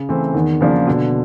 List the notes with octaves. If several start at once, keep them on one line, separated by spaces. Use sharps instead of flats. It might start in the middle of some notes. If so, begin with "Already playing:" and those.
Already playing: C#3
E3 A3 C4
E2 D#3
C#3 F3 A#3 D4
B2 D3